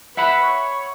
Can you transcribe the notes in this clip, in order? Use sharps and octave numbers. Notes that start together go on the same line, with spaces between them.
B4 E5 F#5 B5
C#5